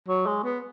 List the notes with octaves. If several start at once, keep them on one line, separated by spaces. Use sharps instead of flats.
F#3
G#3
B3